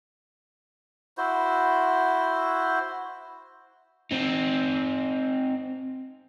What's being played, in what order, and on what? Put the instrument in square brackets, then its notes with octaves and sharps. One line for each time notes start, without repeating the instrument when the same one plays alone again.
[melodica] E4 F#4 C5
[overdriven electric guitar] C4 D#4